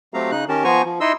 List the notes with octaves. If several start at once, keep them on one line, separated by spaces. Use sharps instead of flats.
F#3 A3 C4 G4 F5 A#5
C#3 D#4 F#6
D#3 C#4 G4 A#4 A5
F3 B3 C5 G#5 A#5 C#6
F3
D#4 E4 D#5 C6 E6